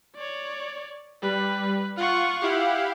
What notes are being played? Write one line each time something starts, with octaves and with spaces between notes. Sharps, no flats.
C#5 D5
G3 B4
F4 F#5 C#6
E4 G4 F5 F#5